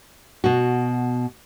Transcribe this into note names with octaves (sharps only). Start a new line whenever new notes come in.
B2 F#4